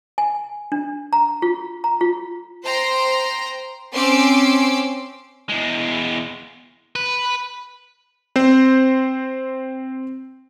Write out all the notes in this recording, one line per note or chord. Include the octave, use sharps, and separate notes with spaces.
G#5
D4
A#5
F4
A#5
F4
C5 G5 A#5 C6
C4 C#4 C6 D6 E6 D7
E2 G#3
B4
C4 C5